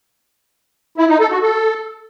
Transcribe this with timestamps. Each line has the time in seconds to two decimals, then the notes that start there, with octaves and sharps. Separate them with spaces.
0.98 E4
1.09 D#4
1.20 A4
1.31 F#4
1.42 A4